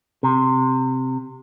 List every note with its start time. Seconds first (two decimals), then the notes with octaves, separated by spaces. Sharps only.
0.23 C3